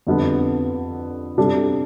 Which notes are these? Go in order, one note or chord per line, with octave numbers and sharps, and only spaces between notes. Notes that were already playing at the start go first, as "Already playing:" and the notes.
F2 D3 G3 B3
C3 G3 D4 A4